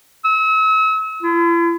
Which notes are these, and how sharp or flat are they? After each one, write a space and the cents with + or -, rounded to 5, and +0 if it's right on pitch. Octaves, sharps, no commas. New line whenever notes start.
E6 -40
E4 +45